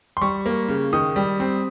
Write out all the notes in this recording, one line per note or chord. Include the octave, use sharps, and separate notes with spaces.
C6
G3 C#6
A#3
C#3
D#3 D#6
G3
C4